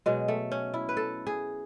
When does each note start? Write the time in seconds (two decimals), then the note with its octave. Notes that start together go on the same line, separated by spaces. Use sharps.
0.06 B2 F#3 G#3
0.28 A3
0.51 C#4
0.74 E4
0.89 B4
0.97 A4
1.27 G#4